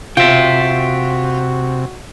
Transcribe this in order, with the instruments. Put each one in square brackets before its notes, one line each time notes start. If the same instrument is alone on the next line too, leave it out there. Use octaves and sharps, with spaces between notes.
[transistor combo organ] C3 [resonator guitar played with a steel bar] F4 [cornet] F#4 [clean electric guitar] E5 G5